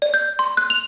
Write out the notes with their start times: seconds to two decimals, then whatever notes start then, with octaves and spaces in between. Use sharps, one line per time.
0.02 D5
0.14 G6
0.39 C6
0.57 F#6
0.70 F7